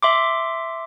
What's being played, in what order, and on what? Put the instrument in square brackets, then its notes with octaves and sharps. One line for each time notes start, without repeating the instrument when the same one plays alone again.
[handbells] E5 C6 D6